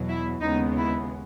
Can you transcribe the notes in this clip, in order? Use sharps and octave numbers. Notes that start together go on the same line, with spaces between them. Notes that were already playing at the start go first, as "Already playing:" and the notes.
Already playing: E2 B2 F#3
E4
D#2 C#3 G#3 B3 D#4
E4